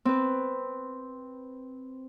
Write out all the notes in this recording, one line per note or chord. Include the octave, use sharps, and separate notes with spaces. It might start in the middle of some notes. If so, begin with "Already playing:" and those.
C4 B4